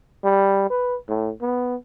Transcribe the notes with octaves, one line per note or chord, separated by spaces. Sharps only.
G3
B4
A2
B3